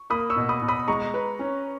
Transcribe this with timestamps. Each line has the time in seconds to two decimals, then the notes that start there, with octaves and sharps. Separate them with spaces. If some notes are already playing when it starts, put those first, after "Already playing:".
Already playing: C#6
0.10 A#3 B5 D#6
0.30 C#6 E6
0.36 B2
0.49 B5 D#6
0.62 B2
0.68 B5 D#6
0.88 G#3 A#5 C#6
1.14 B4
1.39 C#4